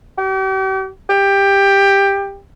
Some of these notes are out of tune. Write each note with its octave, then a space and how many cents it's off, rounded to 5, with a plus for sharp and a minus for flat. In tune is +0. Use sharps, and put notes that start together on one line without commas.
G4 -40
G4 +15